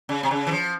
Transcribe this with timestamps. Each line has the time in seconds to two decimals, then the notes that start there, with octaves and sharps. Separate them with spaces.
0.09 C#3
0.23 C3
0.31 C#3
0.47 E3
0.51 F3